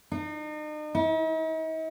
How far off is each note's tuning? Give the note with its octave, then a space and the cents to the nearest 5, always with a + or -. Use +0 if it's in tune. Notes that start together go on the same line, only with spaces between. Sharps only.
D#4 -40
D#4 +45